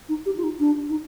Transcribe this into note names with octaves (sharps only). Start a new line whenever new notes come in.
D#4
G4
F4
D#4
D4
D#4